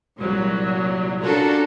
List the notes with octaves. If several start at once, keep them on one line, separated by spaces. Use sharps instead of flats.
C2 A#2 F#3
C#4 D4 F4 F#4 A4 A#4